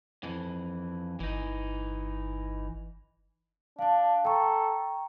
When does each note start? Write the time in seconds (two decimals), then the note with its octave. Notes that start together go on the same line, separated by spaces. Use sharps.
0.23 F2 E3
1.20 G1 E3 D#4
3.79 D4 F5 A5
4.25 A4 G5 A#5 C#6